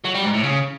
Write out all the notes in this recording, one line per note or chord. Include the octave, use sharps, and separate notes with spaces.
F#3
G3
G#2
A2
C#3